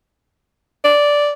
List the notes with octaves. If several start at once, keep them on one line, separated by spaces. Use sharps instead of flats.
D5